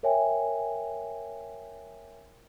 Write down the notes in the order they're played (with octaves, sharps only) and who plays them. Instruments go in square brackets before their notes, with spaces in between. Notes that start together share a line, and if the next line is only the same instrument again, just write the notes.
[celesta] A#4 C#5 E5 G5 G#5